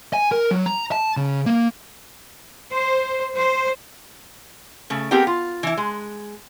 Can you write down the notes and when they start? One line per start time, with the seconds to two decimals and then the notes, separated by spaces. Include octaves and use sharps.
0.13 G#5
0.32 A#4
0.51 F#3
0.66 A#5
0.92 A5
1.17 C#3
1.46 A#3
2.72 C5
3.35 C5
4.90 C#3 A3
5.11 B3 C4 G4 G#4 A#4 G5
5.27 F4
5.63 E3 E4
5.77 G#3